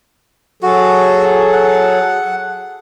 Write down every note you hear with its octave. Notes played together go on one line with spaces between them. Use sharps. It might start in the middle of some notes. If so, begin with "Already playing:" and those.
F#3 F#4 G#4 A4
F#5